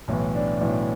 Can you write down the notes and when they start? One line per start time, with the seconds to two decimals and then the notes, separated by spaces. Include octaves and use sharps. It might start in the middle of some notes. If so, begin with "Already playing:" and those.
0.08 B1 A2 E3
0.35 D4
0.61 B1 A2 E3